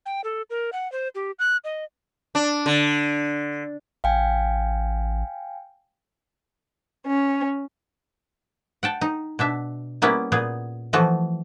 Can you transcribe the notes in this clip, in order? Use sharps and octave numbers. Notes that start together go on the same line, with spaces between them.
G5
A4
A#4
F#5
C5
G4
F#6
D#5
D4
D3
A1 F5 G5 G#5
C#4
F#5 G5 A5
D#4
B2 D4 E5
G3 A#3 B3 C#4 E4
A#2 B3 G#4
E3 F3 A3 B3 F#4